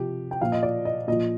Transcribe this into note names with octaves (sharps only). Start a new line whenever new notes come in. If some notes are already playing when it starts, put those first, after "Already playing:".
Already playing: C3 F3 G4
G5
A#2 F3 F5
D#5
D5
D#5
A#2 F3 D#5